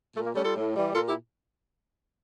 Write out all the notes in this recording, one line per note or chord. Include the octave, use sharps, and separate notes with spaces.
A#2 A3
A#3
G3 A3 C#4
F4 A4
A2
E3 G3
A#2 F4 A4
E4 G4